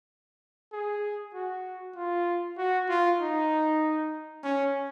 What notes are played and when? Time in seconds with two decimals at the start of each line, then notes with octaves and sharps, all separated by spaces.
0.72 G#4
1.34 F#4
1.95 F4
2.57 F#4
2.89 F4
3.20 D#4
4.43 C#4